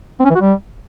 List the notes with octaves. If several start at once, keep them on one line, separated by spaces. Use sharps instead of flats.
C4
C#4
E3
F#4
G3